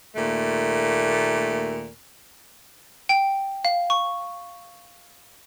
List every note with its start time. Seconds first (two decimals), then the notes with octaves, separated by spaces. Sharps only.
0.16 D#2 A#2 A3
3.09 G5
3.65 F5
3.90 C#6